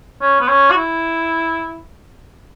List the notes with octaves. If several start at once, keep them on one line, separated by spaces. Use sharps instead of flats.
C#4
B3
C#4
F#4
E4